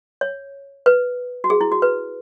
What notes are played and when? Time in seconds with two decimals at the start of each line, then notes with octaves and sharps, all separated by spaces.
0.21 C#5
0.86 B4
1.44 F#4
1.50 G#4
1.61 E4
1.72 F#4
1.82 B4